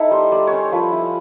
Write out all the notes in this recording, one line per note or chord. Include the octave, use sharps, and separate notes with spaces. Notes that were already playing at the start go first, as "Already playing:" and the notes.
Already playing: D#4 E4 A4
G3 C5
G3 D5
C#4 C5 C#5
F3 B4
E4